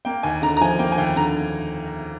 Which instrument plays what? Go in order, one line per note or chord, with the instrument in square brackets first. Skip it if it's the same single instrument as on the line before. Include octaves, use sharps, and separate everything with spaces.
[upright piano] A#3 G5
D#2 G#5
D3 A#5
A#5
F3 G#5
A#3 G5
G#5
D#2 G5
D3 A#5